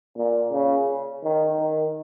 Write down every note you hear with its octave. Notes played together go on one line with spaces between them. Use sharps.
A#2
C#3
D#3
D#3